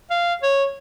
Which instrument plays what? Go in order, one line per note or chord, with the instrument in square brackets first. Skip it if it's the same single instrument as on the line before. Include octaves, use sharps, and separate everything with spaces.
[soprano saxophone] F5
C#5